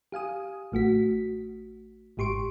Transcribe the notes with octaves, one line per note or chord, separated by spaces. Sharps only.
G4 F5 G#5 D#6
A1 A3 F#4 B6
G#1 G#2 G4 C6 C#6 D7